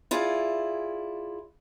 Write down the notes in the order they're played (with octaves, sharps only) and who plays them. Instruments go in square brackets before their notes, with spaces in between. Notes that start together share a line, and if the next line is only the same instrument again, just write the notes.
[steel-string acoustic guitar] E4 F4 G#4 D5